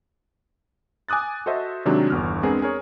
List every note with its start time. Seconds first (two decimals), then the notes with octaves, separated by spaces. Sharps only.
1.09 G#5 D6 D#6 F#6 A6
1.46 F#4 A4 C5 D#5 E5
1.85 C3 D#3 F#3 G#3 D4 F#4
2.10 G1 E2 F6
2.43 G#3 B3 C4 D4 G#4 A#4
2.62 G#4 A#4 C#5